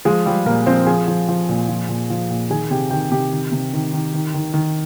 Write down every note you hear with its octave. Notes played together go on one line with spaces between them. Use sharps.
F3 G#3 G#4
F3 G3 G4
A#2 A#3 A#4
F3 C4 C5
F3 G#4 G#5
F3
F3
A#2
F3
A#2
F3
A#2
D#3 G#4 G#5
C3 G4 G5
D#3 G4 G5
C3 G4 G5
D#3
C3
D#3
D#3
D#3
D#3
D#3